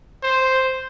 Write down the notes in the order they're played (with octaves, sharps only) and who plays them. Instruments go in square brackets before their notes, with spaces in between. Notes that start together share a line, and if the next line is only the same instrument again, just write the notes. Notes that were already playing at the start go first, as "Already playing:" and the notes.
[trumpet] C5